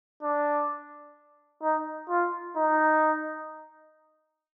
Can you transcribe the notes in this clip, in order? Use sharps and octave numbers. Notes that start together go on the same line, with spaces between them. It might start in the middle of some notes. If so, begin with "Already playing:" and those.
D4
D#4
F4
D#4